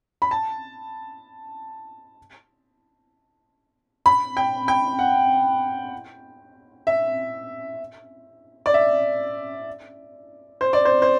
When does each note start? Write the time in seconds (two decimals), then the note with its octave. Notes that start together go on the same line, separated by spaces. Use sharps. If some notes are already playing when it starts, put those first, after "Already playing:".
0.22 B5
0.31 A5
4.06 B5
4.37 G5
4.68 G5
4.99 F#5
6.87 E5
8.66 D5
8.74 E5
10.61 C5
10.73 D5
10.85 C5
11.02 C5